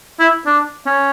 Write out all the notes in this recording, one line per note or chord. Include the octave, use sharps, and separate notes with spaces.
E4
D4
C#4